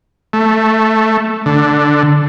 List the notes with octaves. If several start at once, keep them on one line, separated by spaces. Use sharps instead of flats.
A3
D3